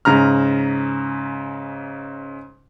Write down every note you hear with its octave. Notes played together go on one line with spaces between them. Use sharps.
G#2 C#3 A#5 F6